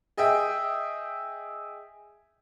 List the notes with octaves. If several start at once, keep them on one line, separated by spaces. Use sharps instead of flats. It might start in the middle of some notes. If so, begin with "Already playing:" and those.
G#4 D#5 E5 G5